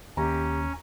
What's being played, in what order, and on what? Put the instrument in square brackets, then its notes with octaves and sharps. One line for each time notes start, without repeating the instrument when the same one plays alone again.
[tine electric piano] D#2 [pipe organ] C#4 [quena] G4 [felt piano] A#5